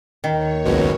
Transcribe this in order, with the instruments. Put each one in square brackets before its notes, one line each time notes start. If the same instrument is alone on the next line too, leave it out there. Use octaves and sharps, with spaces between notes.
[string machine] D#2 C#5 [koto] D#3
[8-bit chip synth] G#1 C#2 F#2 [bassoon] B2